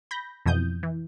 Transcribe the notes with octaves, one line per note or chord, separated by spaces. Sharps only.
B5 G6 A#6
F2 B2 E3 D#6 G6
E3